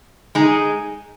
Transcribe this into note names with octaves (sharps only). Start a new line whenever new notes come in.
G#3 D#4 G#4